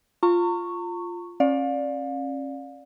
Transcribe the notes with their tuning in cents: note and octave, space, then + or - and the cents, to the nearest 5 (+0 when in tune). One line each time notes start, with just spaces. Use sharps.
F4 +0 A#5 -40 C#6 +0
C#4 -35 D5 +0 F5 +35